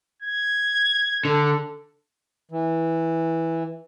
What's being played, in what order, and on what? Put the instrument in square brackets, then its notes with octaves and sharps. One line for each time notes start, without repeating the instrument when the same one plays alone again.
[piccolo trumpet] G#6
[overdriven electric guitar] D3 [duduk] A4
[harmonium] E3